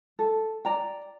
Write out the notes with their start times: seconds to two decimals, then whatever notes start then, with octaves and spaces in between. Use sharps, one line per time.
0.19 A4
0.65 D5 G5 A#5